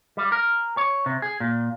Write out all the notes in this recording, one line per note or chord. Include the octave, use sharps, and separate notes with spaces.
G3
A#4
C#5
C3
G#4
A#2